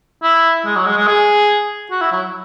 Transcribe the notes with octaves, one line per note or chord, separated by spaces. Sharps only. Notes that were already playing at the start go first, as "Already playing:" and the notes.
E4
G#3
F#3
G#3
G#3
G#4
F#4
E4
F#3